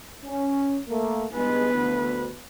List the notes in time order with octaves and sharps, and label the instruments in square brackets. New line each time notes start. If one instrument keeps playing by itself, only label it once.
[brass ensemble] C#4
A3 A#3
[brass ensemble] G2 G#3 G#5 [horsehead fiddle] B3 B4
[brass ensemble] D2